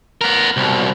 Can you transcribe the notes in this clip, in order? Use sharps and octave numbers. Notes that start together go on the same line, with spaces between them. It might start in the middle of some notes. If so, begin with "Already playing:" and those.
B3 A#4
C2 B2